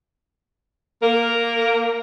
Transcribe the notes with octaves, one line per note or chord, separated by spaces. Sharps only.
A#3 A#4